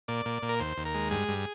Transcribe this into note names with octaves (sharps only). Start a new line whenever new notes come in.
A#2 D5
A#2
A#2
A#4
D#2 C5
D#2
A#4
G#3
G2 G#4
G2